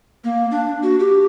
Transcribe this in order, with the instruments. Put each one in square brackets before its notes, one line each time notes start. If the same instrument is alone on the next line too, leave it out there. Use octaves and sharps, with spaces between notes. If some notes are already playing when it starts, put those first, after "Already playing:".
[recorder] A#3
D4
F#4
G4